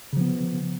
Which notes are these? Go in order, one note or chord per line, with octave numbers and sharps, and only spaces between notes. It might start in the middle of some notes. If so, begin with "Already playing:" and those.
C#3 F3 B3